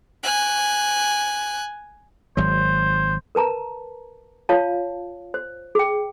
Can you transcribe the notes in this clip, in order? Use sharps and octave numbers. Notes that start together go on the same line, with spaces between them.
G#5 F#6
G#1 F#3 C5
A#4 B4 A5 A#5
F4 C#5 F5 A5
C5
G#4 G5